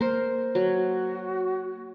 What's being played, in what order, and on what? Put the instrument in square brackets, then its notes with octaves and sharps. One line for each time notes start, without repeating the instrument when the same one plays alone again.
[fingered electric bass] A#3 [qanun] A#4 C5
[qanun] F#3 [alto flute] F#4